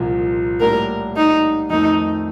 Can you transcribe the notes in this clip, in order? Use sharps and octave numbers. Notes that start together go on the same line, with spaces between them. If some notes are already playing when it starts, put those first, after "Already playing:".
Already playing: C2 A#2 F3
A2 G3 A#3 D4 A#4
D#4
F2 D#3 A3 D#4